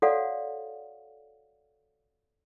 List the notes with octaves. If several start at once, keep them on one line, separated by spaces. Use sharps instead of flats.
F#4 A4 C#5 D5 F5 F#5